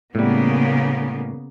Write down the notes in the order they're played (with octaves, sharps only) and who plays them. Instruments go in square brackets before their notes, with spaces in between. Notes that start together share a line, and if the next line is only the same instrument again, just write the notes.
[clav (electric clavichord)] A2 G3 [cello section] C#3 A#3 B3